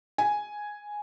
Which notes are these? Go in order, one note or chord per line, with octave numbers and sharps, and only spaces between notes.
G#5